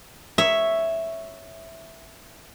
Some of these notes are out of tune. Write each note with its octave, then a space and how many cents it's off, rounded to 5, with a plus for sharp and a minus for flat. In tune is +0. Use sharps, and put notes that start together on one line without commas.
C#5 +0 E5 +0